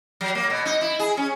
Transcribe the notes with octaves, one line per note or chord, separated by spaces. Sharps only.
F#3
A#3
B2
D#4
E4
G#4
C#4